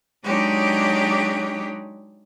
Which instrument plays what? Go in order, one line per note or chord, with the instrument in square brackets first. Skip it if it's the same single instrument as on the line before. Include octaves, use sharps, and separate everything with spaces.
[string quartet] F#3 G#3 D4 D#4 G4 C#5